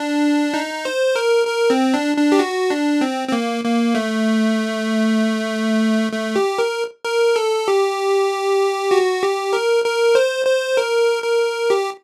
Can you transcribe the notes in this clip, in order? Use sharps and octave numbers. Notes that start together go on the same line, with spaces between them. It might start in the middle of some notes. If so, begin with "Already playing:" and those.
Already playing: D4
D#4
C5
A#4
A#4
C4
D4
D4
G4
F#4
D4
C4
C4
A#3
A#3
A3
A3
G4
A#4
A#4
A4
G4
F#4
G4
A#4
A#4
C5
C5
A#4
A#4
G4